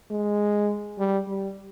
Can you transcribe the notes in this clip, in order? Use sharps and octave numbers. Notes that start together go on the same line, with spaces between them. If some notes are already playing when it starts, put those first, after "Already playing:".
G#3
G3
G3